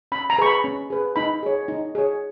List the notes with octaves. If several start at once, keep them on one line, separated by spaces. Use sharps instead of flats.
C#4 B5
A#5
G#4 B4 C#6
B5
C#4
G#4 B4
D#4 B5
G#4 C#5
D#4
G#4 C#5